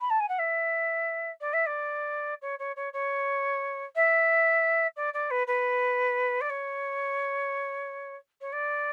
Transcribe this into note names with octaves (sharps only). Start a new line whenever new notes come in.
B5
A5
G#5
F#5
E5
D5
E5
D5
C#5
C#5
C#5
C#5
E5
D5
D5
B4
B4
D5
C#5
C#5
D5